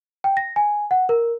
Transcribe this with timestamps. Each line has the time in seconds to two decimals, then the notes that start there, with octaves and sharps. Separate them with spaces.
0.24 G5
0.37 A#6
0.56 G#5
0.91 F#5
1.09 A#4